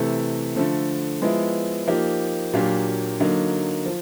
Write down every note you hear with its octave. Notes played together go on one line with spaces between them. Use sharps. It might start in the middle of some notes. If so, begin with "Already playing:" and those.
Already playing: C3 E3 A3
D3 F3 A3
F3 G#3 B3 E4
F3 A#3 D#4 G4
A#2 F#3 A#3 D4 G4
D3 F#3 A#3 D#4
F3